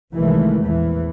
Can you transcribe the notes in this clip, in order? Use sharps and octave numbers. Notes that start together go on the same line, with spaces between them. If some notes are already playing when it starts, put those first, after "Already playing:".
C2 D#3 E3 G#3 A3
A#1 E2 E3